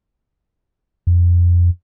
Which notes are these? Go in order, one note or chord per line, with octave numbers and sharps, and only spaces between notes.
F2